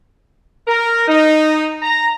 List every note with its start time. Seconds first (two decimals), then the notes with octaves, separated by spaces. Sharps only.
0.67 A#4
1.08 D#4
1.82 A#5